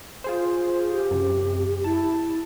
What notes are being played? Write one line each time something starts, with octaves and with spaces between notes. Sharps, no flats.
F4 G#4 C5
G4
F#2 C3
E4 A5